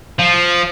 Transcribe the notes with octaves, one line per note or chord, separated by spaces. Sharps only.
F3